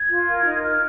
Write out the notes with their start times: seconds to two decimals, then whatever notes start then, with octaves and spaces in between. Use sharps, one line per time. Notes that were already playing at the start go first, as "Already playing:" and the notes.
Already playing: G#6
0.10 F4
0.28 A#4
0.46 D#4
0.64 A#4 F6